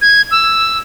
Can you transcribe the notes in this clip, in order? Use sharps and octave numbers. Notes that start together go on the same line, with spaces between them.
G#6
E6